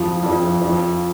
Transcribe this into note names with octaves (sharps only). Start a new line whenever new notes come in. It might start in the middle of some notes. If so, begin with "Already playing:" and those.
Already playing: F2 F3
F2 F3
F2 F3